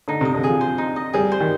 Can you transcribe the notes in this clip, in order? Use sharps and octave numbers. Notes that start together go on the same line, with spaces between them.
D3 D#4
C3 D#5
D3
F3 G#4
C5
D#4
D#5
G3 G#4
C5
D#3